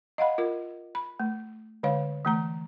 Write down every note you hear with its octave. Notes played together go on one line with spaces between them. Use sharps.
D#5 F5 F#5 B5
F4 A#4
B5
A3
D3 G#3 C#5 F5
E3 A3 A#5